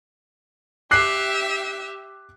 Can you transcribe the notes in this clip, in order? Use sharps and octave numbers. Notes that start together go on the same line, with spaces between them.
G4 E5 D6 F#6 C7